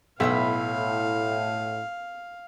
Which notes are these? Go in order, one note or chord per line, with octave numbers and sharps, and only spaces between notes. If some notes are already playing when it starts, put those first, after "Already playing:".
B1 A2 E4 E5 F5 E6